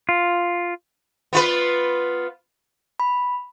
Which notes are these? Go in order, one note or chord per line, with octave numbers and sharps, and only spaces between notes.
F4
B3 F4 B4
B5